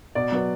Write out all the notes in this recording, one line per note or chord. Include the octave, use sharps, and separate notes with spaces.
B2 D5
F#3 B3